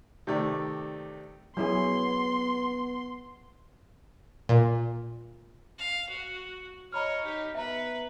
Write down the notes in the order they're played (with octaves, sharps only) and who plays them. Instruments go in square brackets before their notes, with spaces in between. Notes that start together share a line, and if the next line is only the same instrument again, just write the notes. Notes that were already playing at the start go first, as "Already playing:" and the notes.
[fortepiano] C3 D#3 A3 D5
[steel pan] F#3 E4 G#4 [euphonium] B3 [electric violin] C6
[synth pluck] A#2
[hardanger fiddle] F5
F#4
[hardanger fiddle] C#5 D#5 [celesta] A#5 B5 F6
[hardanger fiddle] D#4 G4
[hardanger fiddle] B3 B4 [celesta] E5 A#5